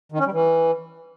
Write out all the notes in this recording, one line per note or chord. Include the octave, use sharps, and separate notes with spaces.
D#3
C#4
G3
E3